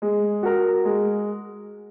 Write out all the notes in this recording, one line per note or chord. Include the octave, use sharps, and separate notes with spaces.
G#3
F#4 A#4
G#3